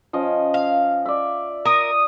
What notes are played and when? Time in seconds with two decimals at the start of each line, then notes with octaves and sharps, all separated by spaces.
0.13 F3 C#4 D#5
0.54 F5
1.05 D5 E5
1.65 A#4 D#6